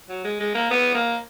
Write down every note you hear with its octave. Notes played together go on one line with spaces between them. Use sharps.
F#3
G#3
G#3
A#3
B3
A#3